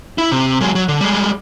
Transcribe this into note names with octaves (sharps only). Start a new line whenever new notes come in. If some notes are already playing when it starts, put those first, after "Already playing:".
E4
C3
F#3 G#3
F#3
D3
G3 G#3